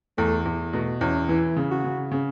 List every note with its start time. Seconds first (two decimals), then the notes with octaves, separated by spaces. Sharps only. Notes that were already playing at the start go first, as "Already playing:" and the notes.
0.18 E2 A3
0.45 E2
0.73 B2 A3
1.01 E2 C#4
1.29 E3 E4
1.56 C#3
1.70 F#4
1.84 C#3
2.12 C#3